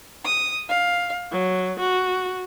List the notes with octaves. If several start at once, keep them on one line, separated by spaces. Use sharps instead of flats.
D#6
F5
F#3
F#4